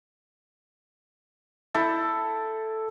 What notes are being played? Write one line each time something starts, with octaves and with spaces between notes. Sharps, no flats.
E4 A4 B5 G6